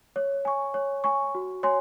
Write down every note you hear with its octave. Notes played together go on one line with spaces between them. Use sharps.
C#5
G#5 C#6
C#5
G#5 C#6
F#4
C#5 G#5 C6